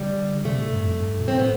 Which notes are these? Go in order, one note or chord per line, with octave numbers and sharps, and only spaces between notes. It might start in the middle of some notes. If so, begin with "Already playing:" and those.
Already playing: D3 G3
C3 A3
A2
G2
F2
G2
B2
A2 C4
B3